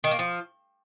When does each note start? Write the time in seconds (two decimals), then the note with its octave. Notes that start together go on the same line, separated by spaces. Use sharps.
0.04 D#3
0.11 A#3
0.19 F3